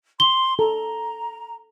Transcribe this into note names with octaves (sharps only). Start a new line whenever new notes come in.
C6 G7
A4 A#5